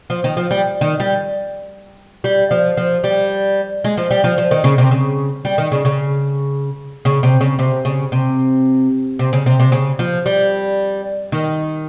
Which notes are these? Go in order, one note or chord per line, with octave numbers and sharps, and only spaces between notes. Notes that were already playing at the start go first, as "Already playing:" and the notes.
F3
D#3
F3
G3
D#3
G3
G3
F3
F3
G3
G#3
F3
G3
F3
F3
D#3
C#3
C3
C#3
G3
D#3
C#3
C#3
C#3
C3
C#3
C3
C#3
C3
C3
C#3
C3
C3
C#3
F3
G3
D#3